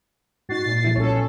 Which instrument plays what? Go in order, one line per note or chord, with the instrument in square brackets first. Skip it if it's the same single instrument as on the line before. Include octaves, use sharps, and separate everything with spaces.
[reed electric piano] G#2 D#4 [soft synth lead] F#4 [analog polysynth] A6 C7
[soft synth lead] A#2
[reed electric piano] F3 G3 E4
[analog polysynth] B1 C#4 A4 [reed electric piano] C#5